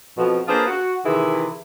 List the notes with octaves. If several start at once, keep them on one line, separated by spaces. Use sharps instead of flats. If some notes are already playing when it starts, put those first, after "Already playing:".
F2 B2 F3
A#3 D4 F4 G#4 B4 C5
F#4
C3 D#3 E3 E4 G#4